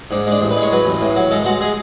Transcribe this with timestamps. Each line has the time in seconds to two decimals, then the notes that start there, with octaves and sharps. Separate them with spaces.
0.11 G#2 D4
0.27 G#3 D4
0.41 A1
0.51 B4
0.56 G#3
0.62 C#5
0.72 F#3 B4
0.85 A1
1.01 A2
1.15 F#3
1.31 G#3 A4
1.45 G#3 F#4
1.61 G#3 G#4